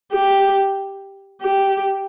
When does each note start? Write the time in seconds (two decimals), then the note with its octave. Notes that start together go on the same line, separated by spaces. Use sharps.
0.13 G4
1.43 G4